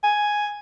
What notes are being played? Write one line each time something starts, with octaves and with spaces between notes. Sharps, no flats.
G#5